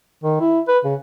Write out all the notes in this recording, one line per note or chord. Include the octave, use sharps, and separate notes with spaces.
D#3
E4
B4
C#3